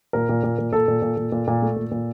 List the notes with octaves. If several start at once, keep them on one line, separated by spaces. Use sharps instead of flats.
A#2 A#4
A#2
A#2
A#2
A#2 A4
A#2
A#2
A#2
A#2
A#2
A3
A#2
A#2